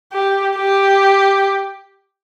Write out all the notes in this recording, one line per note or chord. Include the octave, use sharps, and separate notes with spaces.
G4
G4